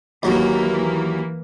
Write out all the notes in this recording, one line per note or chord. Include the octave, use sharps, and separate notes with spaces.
D#2 E3 F#3 A#3